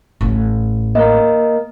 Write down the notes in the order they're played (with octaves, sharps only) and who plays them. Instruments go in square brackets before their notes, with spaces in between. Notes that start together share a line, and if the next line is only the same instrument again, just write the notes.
[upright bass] A1
[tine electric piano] A#3 A#4 [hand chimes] D#5